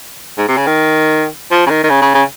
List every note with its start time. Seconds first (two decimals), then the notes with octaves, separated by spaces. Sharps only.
0.38 G#2
0.48 C3
0.57 C#3
0.67 D#3
1.51 F3
1.66 C#3
1.70 D#3
1.83 D#3
1.90 C#3
2.02 C#3
2.14 C#3